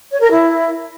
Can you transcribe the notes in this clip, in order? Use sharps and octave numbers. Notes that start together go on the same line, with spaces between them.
C#5
A#4
E4